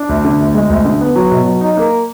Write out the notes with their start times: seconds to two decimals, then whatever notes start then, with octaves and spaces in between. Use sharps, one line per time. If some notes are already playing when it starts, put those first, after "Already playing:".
Already playing: D4
0.09 D2
0.25 D3
0.40 D2
0.55 G#3
0.70 D2
0.85 D3
1.01 B3
1.16 F#3
1.31 B2
1.46 F#3
1.61 D#4
1.77 A#3